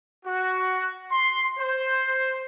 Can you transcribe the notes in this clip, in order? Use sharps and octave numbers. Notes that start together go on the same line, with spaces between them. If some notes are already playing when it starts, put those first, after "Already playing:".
F#4
C6
C5